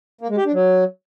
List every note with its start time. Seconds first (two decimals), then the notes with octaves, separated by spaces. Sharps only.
0.21 A#3
0.29 G#3
0.37 G4
0.45 D4
0.54 F#3